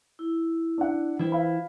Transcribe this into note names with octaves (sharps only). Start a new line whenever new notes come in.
E4
D4 F#5
E3 E4 F4 B4 C5 G5
F5 B5